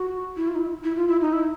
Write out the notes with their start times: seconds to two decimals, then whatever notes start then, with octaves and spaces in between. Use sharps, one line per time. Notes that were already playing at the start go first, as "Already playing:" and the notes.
Already playing: F#4
0.37 E4
0.48 F4
0.55 D#4
0.60 E4
0.84 E4
0.96 F4
1.09 E4
1.21 D#4
1.33 E4